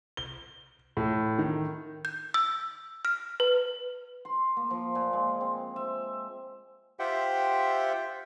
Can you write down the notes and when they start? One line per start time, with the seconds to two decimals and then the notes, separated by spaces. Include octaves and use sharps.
0.17 G7
0.97 A2
1.39 D#3
2.05 G6
2.34 E6
3.05 F6
3.40 B4
4.25 C6
4.57 A#3
4.70 F3
4.95 A#2
5.13 G#3
5.41 C4
5.76 E5
6.99 F4 G4 C5 E5 F#5 G5